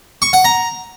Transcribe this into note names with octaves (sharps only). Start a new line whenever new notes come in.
C#6
F#5
A#5